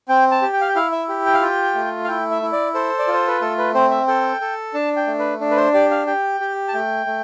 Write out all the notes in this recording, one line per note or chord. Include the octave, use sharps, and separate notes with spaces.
C4 G5
A5
G4
G5
F5
G5
E4 F5
E5
G4
G5
F5
F4 G5
A3
F5
E4 G5
E5
E4
D5
A4 C5
D5
F4
C5
B4
A3 A4
B4
C4 C5
E5
A4 G5
A4
D4 A5
G5
A3
B4
D4
B4
C5
G4 D5
F5
G4 G5
G4
A5
A3 G5
A3